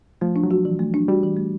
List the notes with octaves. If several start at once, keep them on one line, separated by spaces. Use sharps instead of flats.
F3 A3
D4
F#3
F#4
E3
A3
D4
G3 F#4
E3
A3